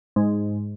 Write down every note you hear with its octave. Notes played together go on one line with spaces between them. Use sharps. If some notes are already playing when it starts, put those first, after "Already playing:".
G#2